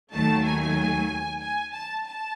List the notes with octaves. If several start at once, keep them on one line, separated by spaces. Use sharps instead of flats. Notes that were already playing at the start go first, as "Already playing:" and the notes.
D#2 D#3 F#3 A3 A5
G#5
G#5
A5
A5